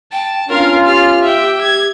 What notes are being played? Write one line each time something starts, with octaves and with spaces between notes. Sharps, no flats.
G5 A5
B3 C#4 D4 F4 A#4 F5
G4 F6
E5 G5
G#6